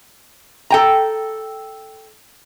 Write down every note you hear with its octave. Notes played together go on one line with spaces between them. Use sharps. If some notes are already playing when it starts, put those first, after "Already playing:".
A4 G5 A#5